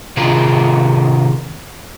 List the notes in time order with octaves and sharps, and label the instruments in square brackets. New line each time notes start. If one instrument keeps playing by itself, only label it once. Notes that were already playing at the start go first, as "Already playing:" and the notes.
[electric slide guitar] C3 D#3 F4 G#4 A#4